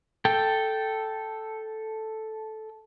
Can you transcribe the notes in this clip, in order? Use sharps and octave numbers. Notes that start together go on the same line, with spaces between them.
A4 G5